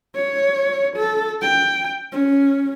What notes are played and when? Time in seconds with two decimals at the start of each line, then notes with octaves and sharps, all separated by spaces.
0.15 C#5
0.96 A4
1.42 G5
2.12 C#4